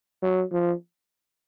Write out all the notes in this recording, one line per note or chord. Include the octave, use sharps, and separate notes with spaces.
F#3
F3